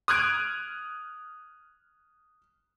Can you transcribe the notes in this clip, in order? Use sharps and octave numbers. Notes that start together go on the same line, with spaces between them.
D#6 F6 F#6 G#6 D7 D#7